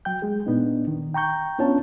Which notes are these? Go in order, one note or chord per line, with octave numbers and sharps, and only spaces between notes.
F#3 G5 G6
G#3 G#4
A#2 B3 D4 D#4
D#3
G5 A#5 C#6 G6
B3 C#4 D4 F4 C#5 A5